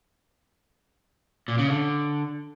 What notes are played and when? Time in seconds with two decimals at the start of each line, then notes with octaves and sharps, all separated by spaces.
1.48 A#2
1.58 C#3
1.69 D3